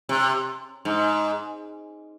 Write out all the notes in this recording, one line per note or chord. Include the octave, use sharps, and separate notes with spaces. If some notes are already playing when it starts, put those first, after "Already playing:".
C3
G#2